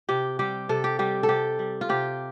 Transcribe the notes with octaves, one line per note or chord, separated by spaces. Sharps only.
C3 G4
G3 G4
C3 A4
G4
G3 G4
A4
C3 G4
G3
F4
C3 G4